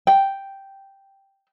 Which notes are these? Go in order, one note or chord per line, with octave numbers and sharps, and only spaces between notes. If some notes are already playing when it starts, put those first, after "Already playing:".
G5